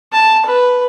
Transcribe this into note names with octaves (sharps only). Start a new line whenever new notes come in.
A5
B4